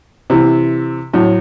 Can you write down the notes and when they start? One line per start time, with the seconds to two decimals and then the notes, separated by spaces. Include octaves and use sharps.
0.30 C3 E3
1.13 A2 F#3